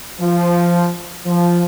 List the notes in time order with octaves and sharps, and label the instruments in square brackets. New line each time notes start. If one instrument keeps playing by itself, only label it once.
[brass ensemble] F3
F3